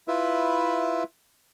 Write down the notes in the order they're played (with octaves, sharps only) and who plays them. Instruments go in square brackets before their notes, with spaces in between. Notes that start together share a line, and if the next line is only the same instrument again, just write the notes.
[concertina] E4 F4 B4 E5